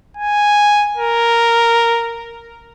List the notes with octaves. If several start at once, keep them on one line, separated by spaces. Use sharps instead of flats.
G#5
A#4